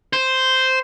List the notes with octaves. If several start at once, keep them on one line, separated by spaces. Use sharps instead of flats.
C5